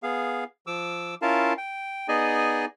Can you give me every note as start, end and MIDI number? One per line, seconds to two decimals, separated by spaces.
0.03 0.44 59
0.03 0.44 68
0.03 0.44 77
0.67 1.15 53
0.67 1.15 86
0.67 1.15 88
1.22 1.53 61
1.22 1.53 64
1.22 1.53 65
1.22 1.53 70
1.22 1.53 77
1.22 1.53 81
1.58 2.07 79
2.08 2.65 59
2.08 2.65 63
2.08 2.65 68
2.08 2.65 74
2.08 2.65 75
2.08 2.65 80